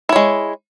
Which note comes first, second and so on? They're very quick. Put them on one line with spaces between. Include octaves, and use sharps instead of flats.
E4 C#5 G#3